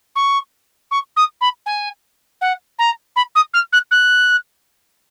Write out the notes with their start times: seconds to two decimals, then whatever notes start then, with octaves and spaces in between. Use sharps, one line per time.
0.15 C#6
0.91 C#6
1.16 D#6
1.41 B5
1.66 G#5
2.41 F#5
2.79 A#5
3.16 B5
3.35 D#6
3.53 F6
3.72 F#6
3.91 F#6